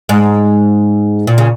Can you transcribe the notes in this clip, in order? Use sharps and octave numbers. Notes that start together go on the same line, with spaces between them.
G#2
A#2
C#3